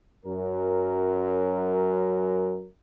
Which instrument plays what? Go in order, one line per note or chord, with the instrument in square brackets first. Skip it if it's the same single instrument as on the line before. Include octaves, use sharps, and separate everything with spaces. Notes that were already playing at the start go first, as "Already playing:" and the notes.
[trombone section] F#2 A#4